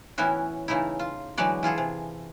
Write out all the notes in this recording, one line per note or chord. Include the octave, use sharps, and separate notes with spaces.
A2 E3 B3 C#4 E4 F#4
C#3 E3 A3 D#4 E4
F4
D3 E3 F#3 G#3 F#4 D5
E3 F4 G#4 A4
C3